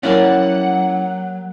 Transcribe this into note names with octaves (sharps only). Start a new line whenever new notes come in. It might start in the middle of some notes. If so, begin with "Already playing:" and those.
F#3 G3 A#3 C#4 E4 C#5 D5 F#5